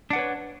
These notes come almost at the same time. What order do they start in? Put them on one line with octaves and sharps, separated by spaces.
D4 F#5 B4 C#5